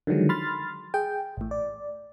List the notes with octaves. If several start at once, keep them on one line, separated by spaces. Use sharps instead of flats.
D3 D#3 F3 F#3 G#3
B5 C6 F6 A6
G#4 G5
A1 A2
D5